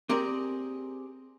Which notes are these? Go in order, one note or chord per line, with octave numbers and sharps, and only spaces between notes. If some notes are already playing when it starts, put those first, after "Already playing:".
C4 G4 G#4 A#4 D5